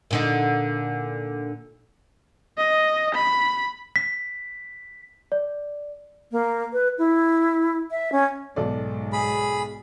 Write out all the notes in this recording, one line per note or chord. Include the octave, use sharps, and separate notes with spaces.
A#2 D3 D#4
D#5
B5
B6
D5
A#3
B4
E4
E5
C#4
B1 G#2 A4 D5
G#4 B5